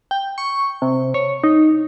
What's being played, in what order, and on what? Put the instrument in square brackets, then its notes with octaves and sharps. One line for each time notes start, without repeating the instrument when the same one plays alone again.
[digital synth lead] G5
C#6
C3
C#5
D#4